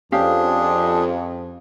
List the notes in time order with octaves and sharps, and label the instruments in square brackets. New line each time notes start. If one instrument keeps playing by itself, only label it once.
[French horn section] F2 [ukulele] C#4 G4 F5 [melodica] D4 G#4